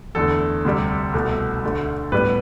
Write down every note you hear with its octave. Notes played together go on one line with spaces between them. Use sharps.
E2 D3 A3 A4
D2 C3 G3
C2 B2 A3
D2 D3 A3
A2 G3 B3 B4